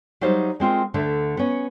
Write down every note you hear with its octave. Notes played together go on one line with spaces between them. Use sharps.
F#3 G3 D#4 C5 F5
G#3 C4 F4 A#4
D2 D3 A3 E5
B3 C#4